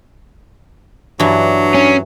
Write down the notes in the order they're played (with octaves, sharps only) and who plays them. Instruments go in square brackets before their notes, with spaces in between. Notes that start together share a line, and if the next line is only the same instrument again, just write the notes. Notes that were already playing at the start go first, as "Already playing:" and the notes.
[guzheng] G2 E3 [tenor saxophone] F#3 [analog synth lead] D4
[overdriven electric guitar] C#4